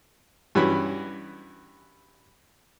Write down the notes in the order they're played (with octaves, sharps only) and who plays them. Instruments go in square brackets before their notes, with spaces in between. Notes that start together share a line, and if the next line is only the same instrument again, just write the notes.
[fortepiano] G2 E3 C#4 F#4 B5